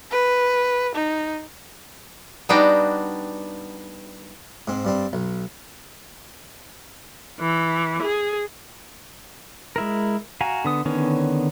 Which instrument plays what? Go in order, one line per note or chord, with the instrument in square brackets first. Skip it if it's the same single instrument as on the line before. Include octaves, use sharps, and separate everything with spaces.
[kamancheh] B4
D#4
[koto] G3 B3 D4 D#4 F#4 G4
[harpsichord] G#2 C4
G2 G3 C4
B1
[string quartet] E3
G#4
[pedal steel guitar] G#3 E4 A#4
F#4 F5 G#5 A#5
D3 B3 D#6
D3 D#3 B3 C#4 C#5